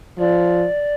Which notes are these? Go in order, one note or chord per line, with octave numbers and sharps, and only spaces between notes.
F3 D5